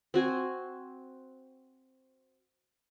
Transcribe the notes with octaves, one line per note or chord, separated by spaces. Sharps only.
C4 F#4 G#5